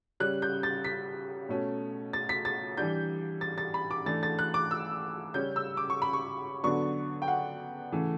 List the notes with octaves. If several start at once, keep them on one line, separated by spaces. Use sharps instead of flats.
C#3 G3 C#4 F#6
G6
A6
B6
B2 A3 C#4
A6
B6
A6
E3 G3 D4 G6
A6
A6
B5
D6
E3 A3 D4 A6
A6
F#6
D6
E6
C#3 G3 C#4 G6
E6
D6
C#6
B5
C#6
D3 F#3 B3 D4 C#6
G5
F#5
C#3 E3 A3